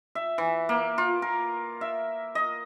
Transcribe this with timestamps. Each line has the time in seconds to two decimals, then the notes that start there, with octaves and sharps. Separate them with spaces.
0.15 E5
0.38 E3
0.69 A#3
0.98 F4
1.22 A#4
1.81 E5
2.35 D#5